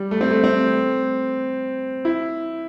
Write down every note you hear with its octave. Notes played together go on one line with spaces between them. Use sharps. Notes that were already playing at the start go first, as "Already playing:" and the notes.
Already playing: G3
A3
C4
A3
C4
E4